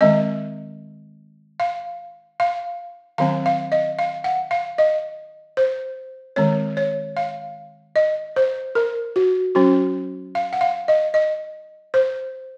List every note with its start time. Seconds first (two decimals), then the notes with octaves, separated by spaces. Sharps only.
0.01 D#3 G#3 C4 D#5
1.60 F5
2.40 F5
3.18 D#3 F#3 C4 F5
3.46 F5
3.72 D#5
3.99 F5
4.24 F#5
4.51 F5
4.78 D#5
5.57 C5
6.36 D#3 G#3 C4 C#5
6.77 C#5
7.17 F5
7.96 D#5
8.36 C5
8.75 A#4
9.16 F#4
9.55 F#3 C#4 F#4
10.35 F5
10.53 F#5
10.61 F5
10.88 D#5
11.14 D#5
11.94 C5